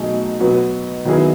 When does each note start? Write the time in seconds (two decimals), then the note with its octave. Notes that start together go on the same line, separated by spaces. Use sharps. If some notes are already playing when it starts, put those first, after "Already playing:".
Already playing: B2 F#3 A3 D#4 G#4
0.40 B2 F#3 B3
1.05 D#3 F#3 B3 E4 G#4